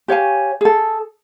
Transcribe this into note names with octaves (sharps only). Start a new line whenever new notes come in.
G4 C#5 F5 G#5
G#4 A4